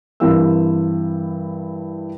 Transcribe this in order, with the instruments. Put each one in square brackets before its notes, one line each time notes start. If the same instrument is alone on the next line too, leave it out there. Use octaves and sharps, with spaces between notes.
[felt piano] G2 E3 C4 A#4 F5 E6